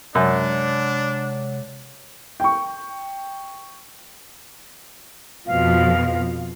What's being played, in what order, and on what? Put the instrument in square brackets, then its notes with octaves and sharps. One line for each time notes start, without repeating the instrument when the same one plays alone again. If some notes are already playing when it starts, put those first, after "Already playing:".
[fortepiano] F#2 [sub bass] C3 [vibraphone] G#3 C#5 F#5 [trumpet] D4
[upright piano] G5 C#6
[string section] F2 B2 F3 [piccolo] F5